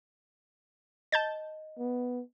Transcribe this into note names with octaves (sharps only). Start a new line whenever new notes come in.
D#5 A5 G6 A6
B3